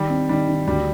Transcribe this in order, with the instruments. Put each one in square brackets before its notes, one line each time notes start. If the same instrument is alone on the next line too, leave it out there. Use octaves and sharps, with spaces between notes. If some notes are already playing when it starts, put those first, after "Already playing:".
Already playing: [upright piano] D#3 [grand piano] G3
[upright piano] C4
[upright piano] D#3 [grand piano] G3
[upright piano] D#3
[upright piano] D2 [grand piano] G3